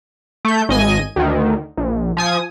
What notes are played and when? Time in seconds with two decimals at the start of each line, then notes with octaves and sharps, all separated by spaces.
0.45 A3 G6
0.69 G#1 D#5 G#5 D#7
1.16 D2 D#3
1.77 A#1
2.17 F3 G#5 D#6